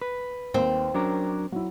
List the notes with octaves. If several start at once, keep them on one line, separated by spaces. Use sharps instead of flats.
B4
D#2 C4
F#3 C#4 D4 A#4 D6
F#3 E4